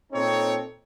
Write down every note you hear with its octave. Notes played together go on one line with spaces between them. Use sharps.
A#2 C4 D#4 A4 C#5